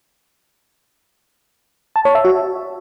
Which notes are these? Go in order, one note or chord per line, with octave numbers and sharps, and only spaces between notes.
A5
C#5
E5
F#4